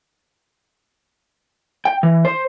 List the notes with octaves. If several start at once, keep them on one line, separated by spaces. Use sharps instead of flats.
G5
E3
C5